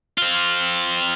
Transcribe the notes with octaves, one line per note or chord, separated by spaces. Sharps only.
C4 F4